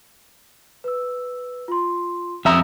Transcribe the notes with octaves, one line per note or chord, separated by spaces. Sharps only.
B4 E6
F4 C6
F2 E5 A#5 D#6